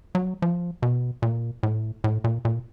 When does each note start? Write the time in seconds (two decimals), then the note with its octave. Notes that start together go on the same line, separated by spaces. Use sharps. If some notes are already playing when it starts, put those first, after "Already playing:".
0.15 F#3
0.42 F3
0.82 B2
1.22 A#2
1.63 A2
2.04 A2
2.24 A#2
2.45 A#2